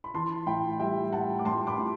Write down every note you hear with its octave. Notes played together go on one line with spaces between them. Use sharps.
B5
E3 A5 C6
A2 G5 B5
G3 E5 G5
A2 F#5 A5
D6
A2 A5 C6
B5 D6
A2